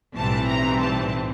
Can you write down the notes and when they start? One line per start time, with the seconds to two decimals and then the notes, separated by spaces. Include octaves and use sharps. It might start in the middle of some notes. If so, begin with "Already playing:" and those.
0.16 B1 A2 E3 G3 C4 A5
0.48 A#5
0.80 A5